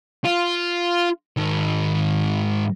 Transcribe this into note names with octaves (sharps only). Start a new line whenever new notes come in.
F4
G#2 D#3